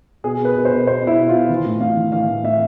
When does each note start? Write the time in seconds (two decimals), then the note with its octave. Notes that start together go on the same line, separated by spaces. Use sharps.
0.24 B2 G#4
0.40 B2 B4
0.56 B2
0.65 C5
0.71 B2
0.87 B2 C5
1.03 B2 E4
1.18 B2
1.29 F4
1.33 B2
1.49 E3
1.66 A2
1.81 A2 F5
1.97 E3
2.12 E3 F5
2.29 A2
2.43 A2 E5